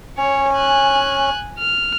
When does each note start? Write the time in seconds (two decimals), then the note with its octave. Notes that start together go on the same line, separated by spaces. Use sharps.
0.18 C#4 C#5
0.53 G#5 F#6
1.59 F6